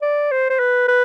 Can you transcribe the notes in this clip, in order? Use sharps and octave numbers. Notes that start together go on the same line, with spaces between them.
D5
C5
C5
B4
B4